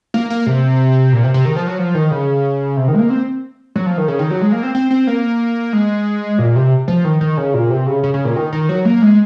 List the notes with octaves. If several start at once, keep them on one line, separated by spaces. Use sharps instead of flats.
A#3
A#3
C3
A#2
C3
C3
D#3
F3
F#3
F3
D#3
C#3
C3
D#3
G#3
A#3
C4
F#3
F3
D#3
C#3
D#3
F#3
G#3
A#3
C4
C4
C4
A#3
G#3
A#2
C3
F3
D#3
D#3
C#3
A#2
C3
C#3
C#3
C#3
A#2
D#3
D#3
F#3
A#3
G#3